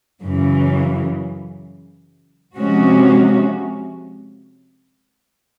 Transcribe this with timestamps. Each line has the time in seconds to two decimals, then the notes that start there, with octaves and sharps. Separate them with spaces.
0.20 F#2 C#3 E3
2.56 C3 F3 G#3 C#4 F#4